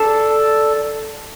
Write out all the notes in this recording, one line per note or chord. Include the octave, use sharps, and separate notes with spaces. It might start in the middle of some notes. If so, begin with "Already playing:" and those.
Already playing: D4 A4